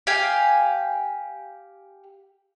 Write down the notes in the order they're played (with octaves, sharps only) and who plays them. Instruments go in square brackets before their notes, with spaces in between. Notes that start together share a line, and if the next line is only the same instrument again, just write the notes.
[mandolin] G4 F5 G#5